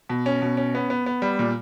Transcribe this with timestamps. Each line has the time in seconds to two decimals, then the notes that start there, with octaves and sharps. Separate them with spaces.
0.09 B2
0.26 C#4
0.42 B2
0.57 C#4
0.75 B3
0.90 B3
1.06 B3
1.22 G3
1.39 A#2